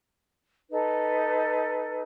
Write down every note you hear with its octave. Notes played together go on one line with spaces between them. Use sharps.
D#4 A4 B4